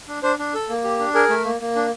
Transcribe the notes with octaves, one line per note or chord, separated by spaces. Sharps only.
D4
D4 C5
D4
A4
A#3
G4
D4
G#4 A#4
A3
A#3
A#3
D4